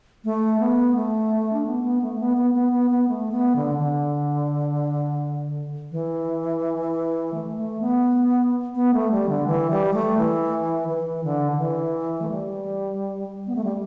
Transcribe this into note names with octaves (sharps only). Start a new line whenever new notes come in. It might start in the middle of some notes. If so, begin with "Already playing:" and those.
A3
B3
A3
D4
B3
B3
A3
B3
B3
B3
B3
B3
A3
B3
D3
D3
E3
A3
A3
B3
B3
A3
G3
D3
E3
G3
A3
E3
E3
D3
D3
E3
A3
G3
B3
A3
G3